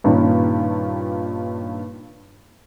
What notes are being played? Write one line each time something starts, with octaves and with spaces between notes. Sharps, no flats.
G2 A#2 D#3 C#4 D4